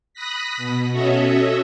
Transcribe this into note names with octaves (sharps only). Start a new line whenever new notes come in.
B5 D#6 F#6 A#6 B6
B2
C#4 F#4 A4 C#5 D#5 E5